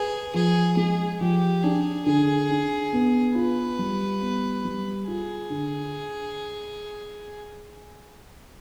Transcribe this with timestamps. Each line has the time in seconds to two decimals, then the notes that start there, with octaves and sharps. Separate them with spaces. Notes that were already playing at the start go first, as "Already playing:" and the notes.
Already playing: G#4 B4
0.34 F3 G#4
0.77 G#3 G#4
1.21 F3 G4
1.63 D4 G#4
2.06 D3 G#4
2.50 D4
2.93 B3
3.35 F4 B4
3.79 G3
4.22 B3
4.65 G3
5.08 F4 G#4
5.50 D3